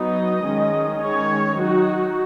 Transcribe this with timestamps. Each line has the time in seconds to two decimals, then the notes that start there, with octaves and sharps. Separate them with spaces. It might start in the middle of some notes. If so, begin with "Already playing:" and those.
Already playing: F#3 B3 D#4 D#5
0.46 D#3 G#3 C#4
1.02 D#3 G#3 C#4 C#5
1.59 F#3 D#4 F#4